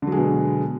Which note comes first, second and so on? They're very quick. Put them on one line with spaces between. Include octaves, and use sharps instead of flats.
D3 F#3 G#3 B2